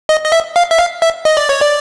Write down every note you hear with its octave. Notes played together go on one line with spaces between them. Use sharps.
D#5
D#5
E5
F5
E5
F5
E5
D#5
D5
C#5
D5